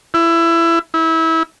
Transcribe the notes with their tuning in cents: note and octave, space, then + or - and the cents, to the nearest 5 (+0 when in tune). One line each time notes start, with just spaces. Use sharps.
E4 +20
E4 -25